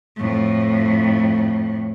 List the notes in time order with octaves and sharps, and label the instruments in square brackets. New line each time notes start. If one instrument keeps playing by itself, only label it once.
[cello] F2 A2